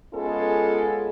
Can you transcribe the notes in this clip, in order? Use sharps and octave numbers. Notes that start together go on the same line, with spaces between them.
G#3 B3 C#4 F4 G#4 A4